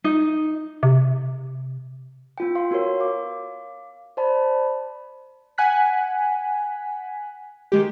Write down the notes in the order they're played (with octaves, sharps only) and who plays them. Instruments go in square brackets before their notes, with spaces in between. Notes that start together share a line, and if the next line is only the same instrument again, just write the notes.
[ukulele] D#4
[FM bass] C3
[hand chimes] B3 F4 G5
F5 C6
B3 F#4 A#4 C#5
F5 D6
C5 D5 A5 B5
[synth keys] F#5 G#5 F#6 B6
D#3 G#3 G4